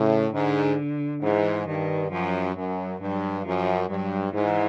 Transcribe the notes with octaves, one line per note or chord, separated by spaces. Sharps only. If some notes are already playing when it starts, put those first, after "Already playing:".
Already playing: A2 C#3
G#2 D3
G#2 E3
G2 D#3
F#2 F3
F#2 F#3
G2 F#3
F#2 F3
G2 F#3
G#2 E3